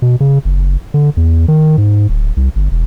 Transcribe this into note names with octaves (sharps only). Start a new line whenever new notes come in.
B2
C#3
F#1
D3
E2
D#3
G#2
D1
C2
G1
E1